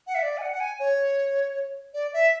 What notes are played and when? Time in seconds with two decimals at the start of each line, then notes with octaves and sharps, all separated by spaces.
0.07 F#5
0.15 E5
0.23 D5
0.38 G#5
0.42 F#5
0.52 F#5
0.60 G#5
0.80 C#5
1.94 D5
2.13 E5